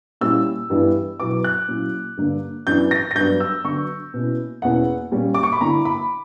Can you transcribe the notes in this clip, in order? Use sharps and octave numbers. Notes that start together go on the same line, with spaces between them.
A#2 G3 C#4 E4 E6
G2 E3 G3 B3 E4
B2 F#3 B3 E4 D6
F#6
A#2 F#3 C#4 E4
G2 D3 A#3 D4
F#2 E3 B3 D4 G6
A#6
A#6
G2 F#3 B3 D4 G6
E6
D3 F#3 B3 D4 C#6
B2 A#3 C#4 E4
E2 B2 A#3 C#4 E4 F#5
A#2 G3 C#4
D6
C#6
B5
D3 A#3 E4 A#5
B5